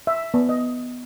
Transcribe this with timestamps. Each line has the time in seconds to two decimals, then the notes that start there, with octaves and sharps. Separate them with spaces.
0.07 E5
0.34 B3
0.49 D#5